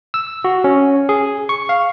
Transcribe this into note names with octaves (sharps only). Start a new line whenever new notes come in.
E6
F#4
C#4
G#4
C#6
F5